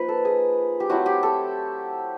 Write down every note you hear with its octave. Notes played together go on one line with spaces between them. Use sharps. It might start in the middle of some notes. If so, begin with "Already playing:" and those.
Already playing: F3 A#3 D#4 B4
A4
G#4
G4
F#3 A3 C4 E4 F#4
G4
A4